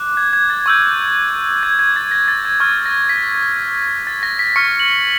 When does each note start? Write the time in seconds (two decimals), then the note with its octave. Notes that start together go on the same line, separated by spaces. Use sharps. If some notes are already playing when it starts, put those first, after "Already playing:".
Already playing: D6 F#6
0.17 G#6
0.33 G#6
0.50 A6
0.66 C#6 E6 G6
1.63 G#6
1.79 G#6
1.96 A6
2.11 A#6
2.28 A6
2.45 G#6
2.60 C#6 F6 G#6
2.86 A#6
3.09 B6
4.07 A6
4.23 A#6
4.39 B6
4.56 C#6 F6 C#7
4.80 F#7